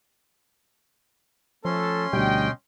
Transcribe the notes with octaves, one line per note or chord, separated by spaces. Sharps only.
F3 A3 C#4 A4 C6
D2 B2 G3 D#5 G5